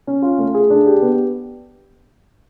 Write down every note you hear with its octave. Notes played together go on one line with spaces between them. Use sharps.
C#4
F4
A3
G#4
D4
G4
B3